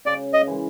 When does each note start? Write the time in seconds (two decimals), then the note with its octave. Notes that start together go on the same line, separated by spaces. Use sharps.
0.06 C#3 D5
0.34 D#5
0.47 E3 G#3